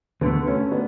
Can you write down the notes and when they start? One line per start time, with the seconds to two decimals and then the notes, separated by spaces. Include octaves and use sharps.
0.21 D2 D3 A3 B3
0.47 A3 C#4
0.72 B3 D4